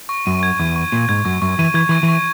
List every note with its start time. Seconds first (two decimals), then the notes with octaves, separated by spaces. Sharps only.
0.09 C#6
0.26 F#2 D#7
0.43 G#6
0.60 E2 C#6
0.76 C#6
0.92 A#2 D#7
1.09 G#2 G#6
1.25 F#2 C#6
1.42 F#2 C#6
1.59 E3 D#7
1.74 E3 G#6
1.89 E3 C#6
2.03 E3
2.08 C#6